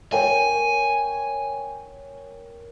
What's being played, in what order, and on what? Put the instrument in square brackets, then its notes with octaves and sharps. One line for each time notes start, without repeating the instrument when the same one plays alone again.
[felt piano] A#4 C#5 G5 [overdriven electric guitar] G#5